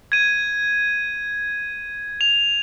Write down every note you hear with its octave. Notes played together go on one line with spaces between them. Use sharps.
G#6 D#7
F7